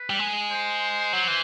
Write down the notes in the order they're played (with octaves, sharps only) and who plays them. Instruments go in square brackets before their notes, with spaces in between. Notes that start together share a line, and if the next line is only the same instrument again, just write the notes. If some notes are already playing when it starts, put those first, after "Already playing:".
Already playing: [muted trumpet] B4
[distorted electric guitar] G3
G#3
[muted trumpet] C5
[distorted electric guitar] F#3
E3